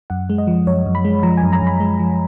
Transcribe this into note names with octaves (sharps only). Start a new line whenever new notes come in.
F#2 F#5
G#3
D#5
F3
F#2 C#5
F#2
B5
G#3
F3 A#5
G#5
F#2
A#5
F#2
B5
G#3
F3